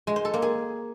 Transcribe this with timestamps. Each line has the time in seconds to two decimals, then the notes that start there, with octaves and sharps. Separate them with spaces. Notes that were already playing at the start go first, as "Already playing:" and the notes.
0.07 G#3
0.16 C5
0.25 A4
0.34 A#3
0.42 G#4